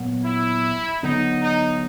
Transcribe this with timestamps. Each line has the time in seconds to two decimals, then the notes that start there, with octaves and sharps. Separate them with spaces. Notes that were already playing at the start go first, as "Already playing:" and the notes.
Already playing: A#2 F#3 B3
0.25 E4
1.03 D3 F#3 B3 D#4
1.42 D#4